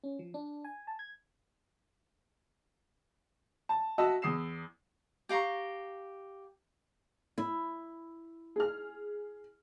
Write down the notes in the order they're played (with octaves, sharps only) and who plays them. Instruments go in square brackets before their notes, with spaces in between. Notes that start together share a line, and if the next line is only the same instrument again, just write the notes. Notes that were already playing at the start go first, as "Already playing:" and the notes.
[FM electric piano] C#4
F3
D4
G#5
A5
G#6
[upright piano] A5
F#4 D#5 E5 A5 E6
E2 D#6 C7 E7
[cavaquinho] G4 F5 A#5 C#6
[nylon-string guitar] E4
[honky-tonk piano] G#4 F6